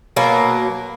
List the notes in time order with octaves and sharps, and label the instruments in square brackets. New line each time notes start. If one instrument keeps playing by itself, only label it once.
[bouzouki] B2 F#3 A#3 A#4